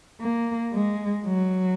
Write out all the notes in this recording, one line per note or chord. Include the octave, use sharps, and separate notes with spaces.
A#3
G#3
F#3